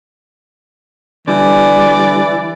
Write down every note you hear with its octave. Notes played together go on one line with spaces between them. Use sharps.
D3 E3 G3 D5